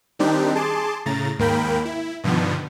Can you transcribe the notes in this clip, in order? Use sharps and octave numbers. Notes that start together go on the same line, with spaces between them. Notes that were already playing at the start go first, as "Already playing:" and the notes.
D#3 G3 C4 D4 D#4 G4
G#4 A5 C6 D6
A2 C#3 A#5 A6
D#2 G#2 A#3 A#4 G5 B5
E4
G2 B2 D3 D#3 F3 B3